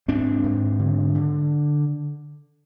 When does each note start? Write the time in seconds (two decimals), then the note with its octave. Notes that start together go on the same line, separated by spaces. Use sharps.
0.08 G#2 C4 D4
0.44 G#2
0.79 D3
1.14 D3